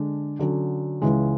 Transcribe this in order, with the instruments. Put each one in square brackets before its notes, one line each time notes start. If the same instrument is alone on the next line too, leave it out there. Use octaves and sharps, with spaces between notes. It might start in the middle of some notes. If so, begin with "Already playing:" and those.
Already playing: [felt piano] D3 G#3 D4
D3 F#3 C#4
C#2 C#3 E3 G#3